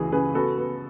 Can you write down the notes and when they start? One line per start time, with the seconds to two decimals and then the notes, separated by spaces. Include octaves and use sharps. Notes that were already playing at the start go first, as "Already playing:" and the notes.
Already playing: C#2 C#3 E3 F#4 G#4
0.12 C#3 G#4 B4
0.35 B3 F#4 A4
0.58 B3